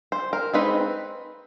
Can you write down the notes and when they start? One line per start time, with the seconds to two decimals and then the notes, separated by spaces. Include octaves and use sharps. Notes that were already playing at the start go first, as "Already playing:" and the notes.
0.12 C5
0.33 A#4
0.53 G#3 C4 D#4 B4